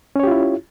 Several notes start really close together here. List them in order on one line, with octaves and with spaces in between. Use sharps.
C#4 C#5 G4 F4 E4